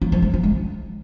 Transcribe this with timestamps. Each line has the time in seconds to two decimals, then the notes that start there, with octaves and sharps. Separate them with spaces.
0.02 F#3
0.12 F3
0.22 G#3
0.34 F#3
0.43 G#3